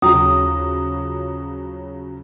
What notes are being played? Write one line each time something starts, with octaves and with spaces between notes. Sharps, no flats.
D#2 C#3 F3 F#3 A#5 D#6